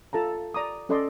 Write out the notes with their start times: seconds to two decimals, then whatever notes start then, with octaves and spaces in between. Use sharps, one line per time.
0.13 F4 A4 A5 A#5
0.54 D5 A#5 D6 D#6
0.89 C#4 A4 D5 D#5 C6